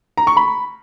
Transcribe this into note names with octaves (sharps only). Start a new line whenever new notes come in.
A#5
C#6
B5